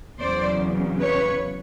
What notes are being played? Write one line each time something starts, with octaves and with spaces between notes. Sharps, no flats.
E2 C#3 F#3 C5 D5
B4 C#5